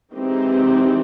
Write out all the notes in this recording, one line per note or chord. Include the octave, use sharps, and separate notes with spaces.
E3 G#3 C4 D#4 G4